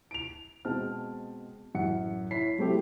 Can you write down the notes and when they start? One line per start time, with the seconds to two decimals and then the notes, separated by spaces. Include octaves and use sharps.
0.11 D7 F7
0.65 B2 G#3 C4 A5 F6
1.74 A1 F#2 F#5 C#7
2.31 E4 C#5 B6 C7
2.58 F#3 G#3 A3 C4 E4 G4